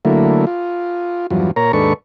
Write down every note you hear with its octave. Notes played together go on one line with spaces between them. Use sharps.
D3 F#3 A3 A#3 E4
F4
E2 G2 F3 F#3
A#2 A#4 C#5 A#5
D#2 G#2 D4 A4 B4 C#6